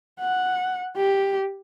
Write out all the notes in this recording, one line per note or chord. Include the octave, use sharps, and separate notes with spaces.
F#5
G4